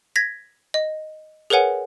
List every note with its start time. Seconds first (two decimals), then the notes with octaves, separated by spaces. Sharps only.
0.16 G#6 A#6 B6
0.74 D#5
1.50 G#4 A#4 B4 C#5 F#5 G#5